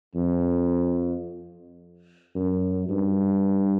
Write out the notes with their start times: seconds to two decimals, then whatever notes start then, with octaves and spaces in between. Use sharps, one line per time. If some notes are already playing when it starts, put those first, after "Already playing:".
0.15 F2
2.35 F#2
2.89 G2